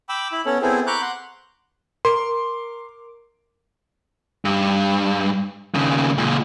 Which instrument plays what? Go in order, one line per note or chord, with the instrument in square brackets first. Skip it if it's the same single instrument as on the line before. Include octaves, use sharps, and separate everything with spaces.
[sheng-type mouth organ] G5 B5 D6 E6
E4 B5
B3 C#4 A4 C#5
B3 C4 E4 G#4 A4
A#5 B5 C#6 D6 F#6 G6
F#5 C6
[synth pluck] A#4 D6 [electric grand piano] C6
[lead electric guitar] G2
D#2 C#3
C#2 A#2